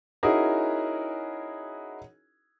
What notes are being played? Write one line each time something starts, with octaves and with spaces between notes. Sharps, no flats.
C#4 D#4 E4 F#4 G#4 A#4